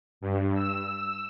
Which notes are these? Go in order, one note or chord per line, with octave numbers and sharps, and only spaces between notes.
G2
E6